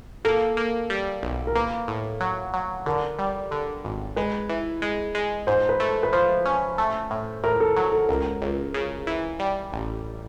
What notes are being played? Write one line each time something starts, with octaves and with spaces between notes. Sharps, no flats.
A#3 A4
A#3
G3
B1
A#4
A#3 B4
A2
F#3
F#3
D3 A#4
G3
D3
G#1
G#3 B4
E3
G#3
G#3
G#2 C5
B4
A3
B4
F3 C5
C#4
A3
A2
A2 A#4
A4
F#3
A4
C#2 A#4
C#2
C#3
E3
G3
A1